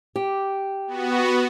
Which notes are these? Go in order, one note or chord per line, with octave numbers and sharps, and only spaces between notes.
G4
B3 F#4